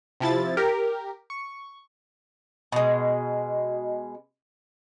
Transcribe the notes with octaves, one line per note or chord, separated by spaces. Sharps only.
C3 F3 E4 A6
G4 A#4
C#6
B2 G#3